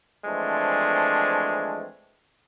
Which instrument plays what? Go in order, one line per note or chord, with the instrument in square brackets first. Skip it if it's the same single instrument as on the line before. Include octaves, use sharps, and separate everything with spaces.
[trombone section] E3 F3 G#3 A3 C4 D4